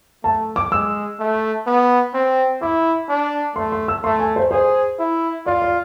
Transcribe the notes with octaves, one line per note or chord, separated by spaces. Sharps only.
A3 A5
D6
G#3 E6
A3
B3
C4
E4 D6
D4
A3 C6
C6
E6
A3 C6
G#5
C5
G#4 C5
E4
F4 D5
D5